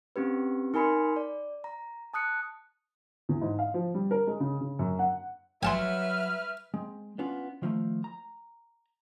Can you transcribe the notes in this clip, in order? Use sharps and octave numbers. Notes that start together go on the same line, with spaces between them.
C4 C#4 G4 B4
D#4 A#4 G#5 B5 C6 C#7
D5
A#5
A5 D#6 F#6 C#7
E2
G#2
F5
F3
G3
A#4
G#3
C#3
C#3
F#2
F#5
F#3 B4 E5 G#5 A5 C6 F6
G#3 C4
B3 C#4 D4 F4
D#3 F3 G#3 A3
A#5